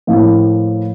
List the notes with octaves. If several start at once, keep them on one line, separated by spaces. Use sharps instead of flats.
A2 F3 A#3 E4